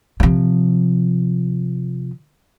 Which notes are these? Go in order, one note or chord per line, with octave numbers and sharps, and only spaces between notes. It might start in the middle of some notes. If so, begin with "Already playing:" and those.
C3 F3